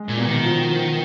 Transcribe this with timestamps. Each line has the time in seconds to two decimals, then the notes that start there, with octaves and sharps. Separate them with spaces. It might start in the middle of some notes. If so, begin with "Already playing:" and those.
Already playing: G#3
0.09 A#2
0.17 B2
0.27 D#3
0.44 F3
0.69 F3